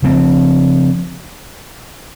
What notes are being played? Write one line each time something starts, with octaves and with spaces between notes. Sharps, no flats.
C#3 F3 C4